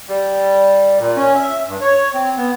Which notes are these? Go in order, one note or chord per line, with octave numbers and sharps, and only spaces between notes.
G3
A#2
C#4
E5
G2
C#5
C4
B3